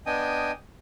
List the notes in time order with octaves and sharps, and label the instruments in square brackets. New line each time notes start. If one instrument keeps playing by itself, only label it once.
[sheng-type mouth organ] B3 D4 D#5 G5 G#5 D#6